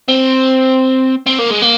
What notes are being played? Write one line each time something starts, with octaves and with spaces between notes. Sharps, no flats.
C4
C4
A#3
G#3
A#3